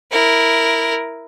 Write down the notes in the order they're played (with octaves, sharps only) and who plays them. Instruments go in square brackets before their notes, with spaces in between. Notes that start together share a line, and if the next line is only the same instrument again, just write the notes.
[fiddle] E4 A#4